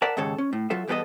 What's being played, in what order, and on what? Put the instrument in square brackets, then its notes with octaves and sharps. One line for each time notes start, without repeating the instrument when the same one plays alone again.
[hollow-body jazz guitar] A#4 D5 E5 F#5 A5
D#2 G#2 C#3 A4 C#5
C#4
A2
F#3 F4 A4 E5
E2 G3 B3 G4 A4 D#5